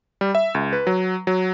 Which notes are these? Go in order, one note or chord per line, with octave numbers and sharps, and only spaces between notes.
G3
E5
C#2
B4
F#3
F#3